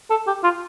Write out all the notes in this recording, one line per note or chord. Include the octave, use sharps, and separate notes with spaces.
A4
G4
F4